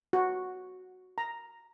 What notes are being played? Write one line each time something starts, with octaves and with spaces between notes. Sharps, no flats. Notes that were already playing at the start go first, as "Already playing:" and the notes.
F#4
A#5